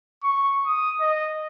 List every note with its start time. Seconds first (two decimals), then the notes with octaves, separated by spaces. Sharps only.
0.23 C#6
0.66 D#6
1.01 D#5